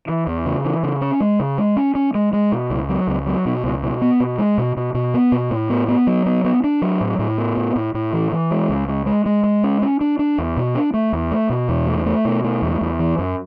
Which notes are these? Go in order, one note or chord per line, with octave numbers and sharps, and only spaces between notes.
E3
E2
C#3
E3
C#3
C#4
G#3
C#3
G#3
C#4
C#4
G#3
G#3
B2
C#2
F#3
C#2
F#3
B2
C#2
B2
B3
B2
G#3
B2
B2
B2
B3
B2
A2
B3
B3
F#3
B3
B3
D4
F#3
A2
A2
B3
A2
A2
A2
E3
E3
G#3
C#2
G#3
G#3
G#3
G#3
C#4
C#4
D4
D4
E2
B2
D4
A3
E2
A3
B2
E2
A3
A3
B2
A3
E2
E2
E3
F#2